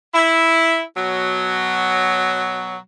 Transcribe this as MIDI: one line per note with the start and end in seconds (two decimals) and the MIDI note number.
0.14 0.81 64
0.95 2.77 47
0.95 2.77 54